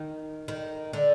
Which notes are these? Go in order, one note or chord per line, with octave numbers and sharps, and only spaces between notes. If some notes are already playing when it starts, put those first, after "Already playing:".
Already playing: D#3
D#3
D3